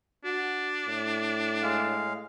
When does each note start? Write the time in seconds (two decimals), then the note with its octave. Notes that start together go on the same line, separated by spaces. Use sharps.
0.25 D4 F#4
0.87 A2
1.63 G#3 F5